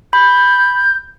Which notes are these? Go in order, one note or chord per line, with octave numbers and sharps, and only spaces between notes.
B5 G6